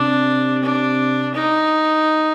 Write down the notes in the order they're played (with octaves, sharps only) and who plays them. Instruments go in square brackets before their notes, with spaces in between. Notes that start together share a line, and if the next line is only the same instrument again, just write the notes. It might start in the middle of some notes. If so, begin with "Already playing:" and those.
Already playing: [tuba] C3 [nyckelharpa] D4
[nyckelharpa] D4
D#4